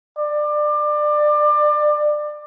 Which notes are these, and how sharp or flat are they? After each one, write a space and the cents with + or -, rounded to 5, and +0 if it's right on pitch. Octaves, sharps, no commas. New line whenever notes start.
D5 +25